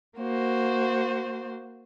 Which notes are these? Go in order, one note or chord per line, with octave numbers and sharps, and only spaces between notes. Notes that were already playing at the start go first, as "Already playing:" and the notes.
A#3 F#4 C5